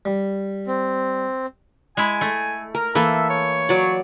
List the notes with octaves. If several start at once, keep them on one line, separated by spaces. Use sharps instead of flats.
G3
C4
G#3 E4 G#5
A3
A#4
E3 A#3 A4 E5
C#5
F#3 D5